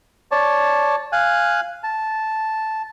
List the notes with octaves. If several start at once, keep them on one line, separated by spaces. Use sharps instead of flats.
C#5 D5 A5
F5 G#5 F#6
A5